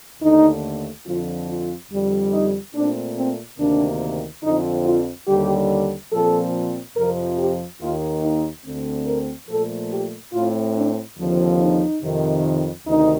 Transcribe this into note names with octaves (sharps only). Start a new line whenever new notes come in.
D#2 D3 A3 D#4
F2 D3 F3 C4 F4
F4
F2 D3 G3
D#4
A#2 A3 C4 D4
C4
D2 C3 D#3 A#3 D4
F2 D3 F3 C4 D#4
F4
D#2 D3 G3 G4
A#2 F3 C4 A4
F2 C3 F3 A#4
G4
D#2 D#3 A#3 F4
D#4
D2 D3 A3 C4
A#4
A#2 F3 A3 A4
G4
A2 A3 C4 F4
D4
D#2 D3 F3 C4
D#4
F2 C3 D#3
D2 C3 D#3 D#4